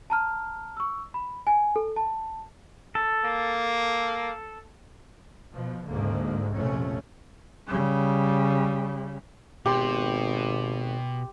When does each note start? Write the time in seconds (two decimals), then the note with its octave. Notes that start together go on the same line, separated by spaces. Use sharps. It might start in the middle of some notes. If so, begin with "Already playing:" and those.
0.10 A5 A#5 F6
0.77 C#6 E6
1.14 B5
1.47 G#5
1.76 A4
1.96 A5
2.95 A4
3.25 A#3
5.53 B2 F3
5.91 D2 G#2 D3 A#3
6.55 A#1 F2 C3 F3 A3 C#4
7.67 C#3 G3
9.66 G#1 B2 G4 C6